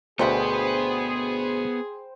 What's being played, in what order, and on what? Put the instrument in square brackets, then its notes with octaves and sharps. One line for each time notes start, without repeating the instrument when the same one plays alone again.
[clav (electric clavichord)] D2 B2 [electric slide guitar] B3 B4 [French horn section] G#4 [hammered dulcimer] C5 G5 B5